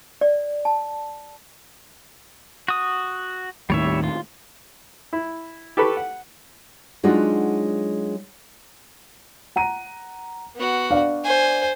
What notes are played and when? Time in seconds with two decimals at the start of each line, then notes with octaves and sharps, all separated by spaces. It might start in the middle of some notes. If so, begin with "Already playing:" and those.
0.21 D5
0.65 A5
2.68 F#4 D#6
3.70 D#2 A2 D#3 G3 C#5 E5
4.04 F4
5.13 E4
5.77 G4 A4 B4 B5 C#6
5.97 F#5
7.03 F#3 G#3 D4 D#4 F4 F#4
9.56 F#5 A#5 D#7
10.56 B3 F#4
10.90 D4 D5 F5
11.24 C5 G#5